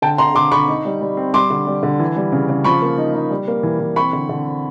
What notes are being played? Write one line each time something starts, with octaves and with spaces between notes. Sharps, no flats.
D3 G5 A5
D3 A#5 C6
D3 C6 D6
D3 B5 C#6
D#4
G3
G3
C4
G3 C6 D6
D3
G3
D3
E3
G3
C#3
C#3
F3 B5 C#6
A#3
D#4
D#4
G3
A#3
E3
E3
C4 B5 C#6
D3
D3
C4